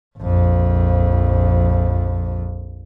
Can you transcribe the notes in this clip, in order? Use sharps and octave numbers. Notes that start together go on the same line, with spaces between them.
A#1 F2